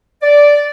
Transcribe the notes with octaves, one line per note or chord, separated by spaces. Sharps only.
D5